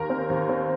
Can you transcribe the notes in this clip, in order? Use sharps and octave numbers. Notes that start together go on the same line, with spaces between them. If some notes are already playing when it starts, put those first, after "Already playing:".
Already playing: D#2 A#4
C4
D#2
C4